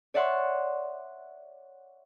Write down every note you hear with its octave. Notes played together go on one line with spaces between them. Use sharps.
C#5 D5 E5 F#5 C6 C#6